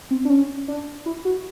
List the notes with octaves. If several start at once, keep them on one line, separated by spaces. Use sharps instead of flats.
C4
D4
C#4
D4
E4
F#4